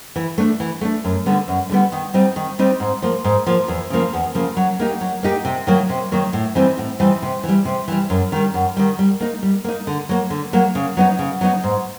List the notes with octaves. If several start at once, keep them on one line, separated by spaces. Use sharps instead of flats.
E3
A3 D4
E3
A3 D4
F#2
D3 G3 B3
F#2
D3 G3 B3
D#3
G3 C4 D#4
D#3
G3 C4 D#4
G#2
F3 A#3
G#2
F3 A#3
E2
C#3 F3 A#3
E2
C#3 F3 A#3
F#3
A#3 D#4 G4
F#3
A#3 D#4 G4
C3
D#3 F#3 A#3
C3
D#3 F#3 A#3
A2
E3 G3 C4 D#4
A2
E3 G3 C4 D#4
C3
E3
G3
C3
E3 G3
F#2
D#3 G3
F#2
D#3 G3
G3
A#3 D#4
G3
A#3 D#4
D3
F#3 A#3
D3
F#3 A#3
C#3
F#3 B3 D#4
C#3
F#3 B3 D#4
G#2